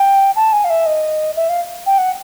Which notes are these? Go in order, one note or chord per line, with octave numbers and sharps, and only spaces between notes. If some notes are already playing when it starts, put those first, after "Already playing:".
Already playing: G5
A5
G#5
F5
E5
D#5
E5
F5
G5
F#5